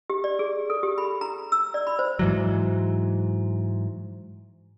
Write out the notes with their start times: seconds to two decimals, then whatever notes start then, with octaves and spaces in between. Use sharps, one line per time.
0.10 G4
0.24 D5
0.39 G#4
0.70 A4
0.83 G4
0.98 B5
1.21 A#5
1.52 E6
1.74 D5
1.87 B5
1.99 C5
2.19 G#2 E3 F#3